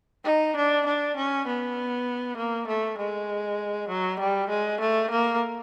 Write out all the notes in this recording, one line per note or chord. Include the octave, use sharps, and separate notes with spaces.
D#4
D4
D4
C#4
B3
A#3
A3
G#3
F#3
G3
G#3
A3
A#3